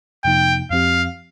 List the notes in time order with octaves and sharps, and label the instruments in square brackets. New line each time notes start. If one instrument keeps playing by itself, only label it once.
[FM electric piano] F2 C3 F3 A#3 D#4 [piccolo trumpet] G5
[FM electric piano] F2 F3 C4 G4 [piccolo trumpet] F5